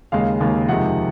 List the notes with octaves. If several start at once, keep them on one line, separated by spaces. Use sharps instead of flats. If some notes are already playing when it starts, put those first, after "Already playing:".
D#2 C#3 G#3 F5
D#2 C#3 G#3
F2 C3 D#3 G#3 F#5